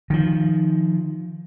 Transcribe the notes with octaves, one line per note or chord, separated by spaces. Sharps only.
D#3 F3